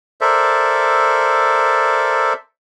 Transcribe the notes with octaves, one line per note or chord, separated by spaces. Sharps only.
A4 A#4 C5 D5 E5